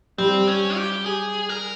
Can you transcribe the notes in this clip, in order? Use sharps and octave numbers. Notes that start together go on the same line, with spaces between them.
G3 C4
C#4
G4
G#4
A#4